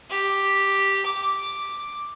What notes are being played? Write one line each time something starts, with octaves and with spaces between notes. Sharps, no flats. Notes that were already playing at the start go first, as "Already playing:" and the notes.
G4
D6